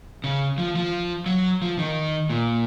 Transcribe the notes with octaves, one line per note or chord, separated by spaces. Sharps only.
C#3
F3
F3
F#3
F3
D#3
A#2